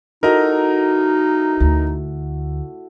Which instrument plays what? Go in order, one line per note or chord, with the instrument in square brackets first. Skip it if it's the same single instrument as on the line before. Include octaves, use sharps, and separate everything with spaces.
[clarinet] D#4 [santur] E4 F#4 A4 [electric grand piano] A#4 D#5 A#5
[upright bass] D2